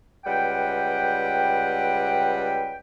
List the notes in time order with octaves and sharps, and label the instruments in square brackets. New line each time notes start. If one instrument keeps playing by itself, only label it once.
[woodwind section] C#2 G3 B4 F#5 G5